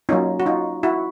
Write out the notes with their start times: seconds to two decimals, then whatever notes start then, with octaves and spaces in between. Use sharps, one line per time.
0.09 F#3 A#3 C#4 D#4 F4
0.40 F#4
0.46 D#4 F4
0.83 E4 F#4